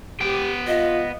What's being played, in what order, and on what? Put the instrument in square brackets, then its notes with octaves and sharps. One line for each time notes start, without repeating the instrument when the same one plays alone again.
[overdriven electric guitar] B3 G5 [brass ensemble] G4
[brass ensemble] F4 [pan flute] D#5